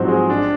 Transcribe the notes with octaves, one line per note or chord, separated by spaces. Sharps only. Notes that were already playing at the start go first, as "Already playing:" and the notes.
Already playing: G#2 F3 F#3 C4
G#3
D4